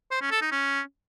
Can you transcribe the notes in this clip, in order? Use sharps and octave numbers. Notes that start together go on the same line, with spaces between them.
C5
C#4
A4
D#4
C#4